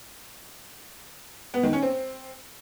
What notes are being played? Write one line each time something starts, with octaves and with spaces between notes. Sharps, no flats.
B3
D#3
C#4
C4